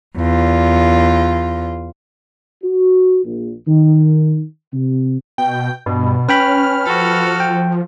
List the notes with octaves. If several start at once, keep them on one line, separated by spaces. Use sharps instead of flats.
E2 F4
F#4
A#1
D#3
C3
B2 G5
G2 B2
C#4 B4 G5 B5 F6
F3 F#4 A4
G5